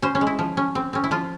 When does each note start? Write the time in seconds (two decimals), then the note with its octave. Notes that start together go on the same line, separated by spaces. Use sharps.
0.02 C#4 C5
0.15 C#4
0.21 G#3
0.27 E4
0.39 F3
0.57 C#4
0.75 C4
0.93 C4 C#4
1.04 E4
1.11 F3 F4